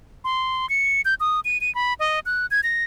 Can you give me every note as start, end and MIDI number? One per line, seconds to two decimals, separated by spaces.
0.24 0.69 84
0.70 1.01 97
1.05 1.14 91
1.20 1.40 87
1.45 1.60 99
1.61 1.73 99
1.75 1.94 83
2.00 2.19 75
2.26 2.46 90
2.51 2.61 92
2.63 2.85 94